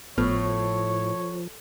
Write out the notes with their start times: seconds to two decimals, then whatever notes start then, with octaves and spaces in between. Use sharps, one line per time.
0.18 G#1 A2 F3 B3 C#5 F6